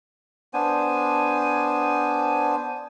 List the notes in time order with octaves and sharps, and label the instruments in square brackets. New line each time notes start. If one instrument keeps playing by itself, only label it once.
[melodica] B3 D4 C5 G#5